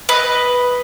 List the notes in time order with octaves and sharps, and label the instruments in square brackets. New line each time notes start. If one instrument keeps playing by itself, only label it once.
[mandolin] B4 D#5